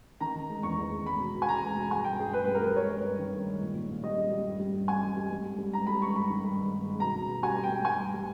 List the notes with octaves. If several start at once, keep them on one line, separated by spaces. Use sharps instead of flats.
D#3 A#5
D#3
G#3
E2 C#6
E2
G#3
G#3 B5
B2
B2
G#5
B2 A#5
G#3
B2
G2 G#5
G2 G5
G2 G#4
G2 B4
B4
G3
A#4
G3 B4
G#3 C#5
G2
G2
D#3
G2
G#3
A#2
A#2
A#2
G3 D#5
G3
G3
G2
G3
G2
G3 G#5
G3
G3
G3
G#2
G3
G#2 A#5
G3 B5
G#2 C#6
G2 B5
D#3
G2
G#3
G2
G#3
B2 A#5
B2
B2
G3 G#5
G3
G5
G3
G2 G#5
G2
G3